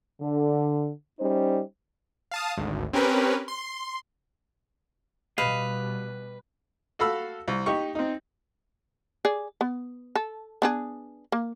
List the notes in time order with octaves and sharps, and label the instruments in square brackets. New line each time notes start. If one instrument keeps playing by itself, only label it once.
[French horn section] D3
G3 C#4 D#4 C5
[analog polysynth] F5 A5 D#6
G#1 D2
C4 C#4 G4 A#4 B4
C6
[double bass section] B2 G3 [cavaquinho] B4 [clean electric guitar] D#5 F5
[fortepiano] F#4 A4 F5 B5 E6
C2
D#4 G4 C#6
C4 D#4
[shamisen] G#4 D5
B3
A4
B3 D4 G#4
A#3